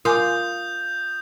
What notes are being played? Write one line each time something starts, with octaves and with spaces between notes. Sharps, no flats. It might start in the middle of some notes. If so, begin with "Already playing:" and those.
F4 A#4 G#5 D6 D#6 G6